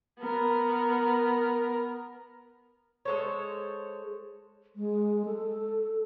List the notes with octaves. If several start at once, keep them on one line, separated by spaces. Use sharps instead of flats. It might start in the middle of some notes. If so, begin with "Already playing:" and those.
B3 A#4
G#3 A4 C5 C#5
G#3
A4